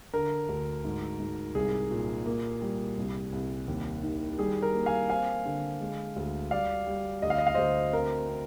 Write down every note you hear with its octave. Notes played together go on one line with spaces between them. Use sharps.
D3 A#4
D2
G#2
G#2
C2 G#4
A#2
A#3
G3
C2
C2
D#2
D#3
G3 G#4
A#4
A#3
F5 G#5
C4 F5 G#5
D3
G#3
D2
G3 D5 F5
G3
D2 D#5
F5
D#5
F5
D2 C5 D#5
C4 A#4
C4